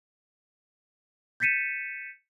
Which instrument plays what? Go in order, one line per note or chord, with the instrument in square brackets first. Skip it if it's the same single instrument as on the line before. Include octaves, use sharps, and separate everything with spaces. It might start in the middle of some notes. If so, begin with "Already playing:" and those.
[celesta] G6 A6 B6 C#7 D#7 E7